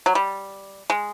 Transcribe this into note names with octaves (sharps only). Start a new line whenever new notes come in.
F#3
G3
G#3